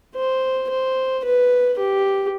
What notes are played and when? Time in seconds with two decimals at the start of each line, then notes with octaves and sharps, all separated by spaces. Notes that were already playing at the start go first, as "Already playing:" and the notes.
0.15 C5
0.70 C5
1.24 B4
1.79 G4